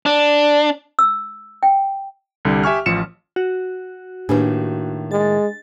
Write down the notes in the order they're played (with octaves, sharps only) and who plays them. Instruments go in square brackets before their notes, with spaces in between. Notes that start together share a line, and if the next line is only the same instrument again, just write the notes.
[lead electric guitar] D4
[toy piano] E6
G5
[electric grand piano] C2 D3 G3
G4 E5 G#5 C#6 F6
A1 F3 C#7 E7
[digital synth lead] F#4
[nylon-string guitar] A2 D#3 A#3 [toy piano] D4 G4 B4
[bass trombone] G#3 [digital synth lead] A6